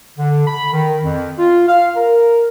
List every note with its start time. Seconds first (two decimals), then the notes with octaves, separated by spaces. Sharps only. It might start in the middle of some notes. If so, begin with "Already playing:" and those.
0.19 D3
0.47 B5
0.73 D#3
1.04 F2
1.38 F4
1.68 F5
1.96 A#4